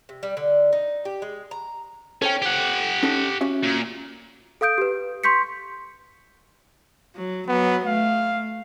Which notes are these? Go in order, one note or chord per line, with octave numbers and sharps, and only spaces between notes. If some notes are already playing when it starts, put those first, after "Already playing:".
C3
G3
D3
D#4
G4
G#3
A#5
C#4 A4 C5 G5
G4 F#5
C#4 D#4 A4
C#4 F#4 E5
A#2
A4 F5 D#6 G6 D7
G4 B4
C6 C#6 G6 B6 C#7
F#3
F#3 B3
A3 F5